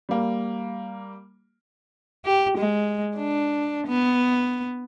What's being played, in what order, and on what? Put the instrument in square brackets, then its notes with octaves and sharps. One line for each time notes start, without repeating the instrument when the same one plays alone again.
[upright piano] G3 A#3
[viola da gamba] G4
G#3
D4
B3